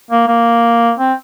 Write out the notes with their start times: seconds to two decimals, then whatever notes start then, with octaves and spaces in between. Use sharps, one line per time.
0.11 A#3
0.27 A#3
0.99 C4